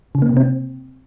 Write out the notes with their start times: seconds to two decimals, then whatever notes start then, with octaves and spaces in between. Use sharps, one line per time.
0.15 C#3
0.22 A#3
0.29 C3
0.37 C4